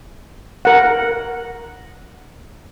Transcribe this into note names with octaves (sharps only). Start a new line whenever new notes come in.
A#4 F#5